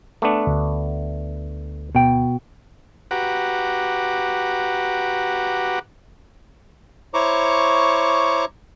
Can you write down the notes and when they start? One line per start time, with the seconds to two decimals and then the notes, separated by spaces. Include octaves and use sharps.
0.22 A3 B3 D4
0.47 D2
1.95 B2 G5
3.11 F#4 G4 B4 F#5 A#5 D6
7.14 E4 C5 C#5 A#5 C#6 D6